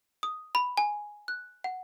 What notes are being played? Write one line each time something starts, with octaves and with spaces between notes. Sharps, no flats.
D#6
B5
G#5
F#6
F#5